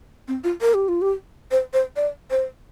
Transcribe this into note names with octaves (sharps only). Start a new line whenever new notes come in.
C4
F4
A#4
G4
F4
G4
C5
C5
D5
C5